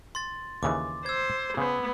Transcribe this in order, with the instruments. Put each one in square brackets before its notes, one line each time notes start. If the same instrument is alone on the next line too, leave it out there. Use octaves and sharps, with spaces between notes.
[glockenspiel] C6 A6
[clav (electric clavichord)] D#2 C#3 E3 [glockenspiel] D6
[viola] C5 [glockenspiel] E6 G#6
[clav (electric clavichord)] C#3 C5 [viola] B3